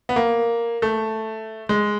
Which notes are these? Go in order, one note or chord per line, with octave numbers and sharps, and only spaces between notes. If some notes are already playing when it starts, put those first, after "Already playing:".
B3
A#3
A3
G#3